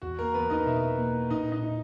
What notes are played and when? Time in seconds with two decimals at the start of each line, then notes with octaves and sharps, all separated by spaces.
0.02 E2 F#4
0.19 A#3 A#4
0.34 E2 B3 B4
0.50 D#4 D#5
0.66 B2 E4 E5
0.98 A#3
1.30 A#2 D#4 D#5
1.52 D#4 D#5
1.63 E4